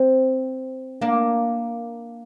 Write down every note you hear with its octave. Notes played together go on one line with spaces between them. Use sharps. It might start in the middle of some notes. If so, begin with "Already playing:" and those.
Already playing: C4
A#3 D4